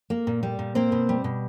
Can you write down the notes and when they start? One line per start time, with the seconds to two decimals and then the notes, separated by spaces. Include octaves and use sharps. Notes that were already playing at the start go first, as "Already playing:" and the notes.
0.10 A#3
0.27 A#2
0.43 G3
0.59 A#2
0.75 A#3 C4 C5
0.92 B2
1.09 G3
1.24 B2